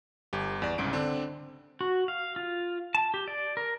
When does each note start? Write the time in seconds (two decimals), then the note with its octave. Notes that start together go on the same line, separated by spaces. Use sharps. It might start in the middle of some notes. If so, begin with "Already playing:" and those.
0.33 G1 G4
0.62 E2 D5
0.78 C2 G#2 C#3 D7
0.93 D3 C4 D4
1.81 F#4
2.08 F5
2.36 F4
2.95 A5
3.14 G4
3.28 D5
3.57 A#4